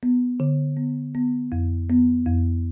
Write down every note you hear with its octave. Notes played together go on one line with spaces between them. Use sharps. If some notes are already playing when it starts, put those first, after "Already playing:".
B3
D3
B3
B3
F2
B3
F2